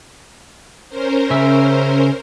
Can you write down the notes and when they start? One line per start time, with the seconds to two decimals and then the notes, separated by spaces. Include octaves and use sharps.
0.89 C#4 A#4 C5
1.31 C#3 E5